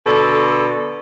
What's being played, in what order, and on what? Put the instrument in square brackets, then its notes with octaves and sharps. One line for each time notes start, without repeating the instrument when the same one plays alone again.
[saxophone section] B2 D3 A4